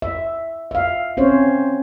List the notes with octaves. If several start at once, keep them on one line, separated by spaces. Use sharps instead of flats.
E5
E5 F5
C4 C#4 C5 C#5